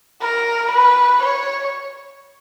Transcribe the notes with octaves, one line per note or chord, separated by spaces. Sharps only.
A#4
B4
C#5